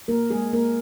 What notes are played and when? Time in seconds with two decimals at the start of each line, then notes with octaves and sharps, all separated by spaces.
0.08 A#3 A#4
0.30 G#3 G#4
0.53 A#3 A#4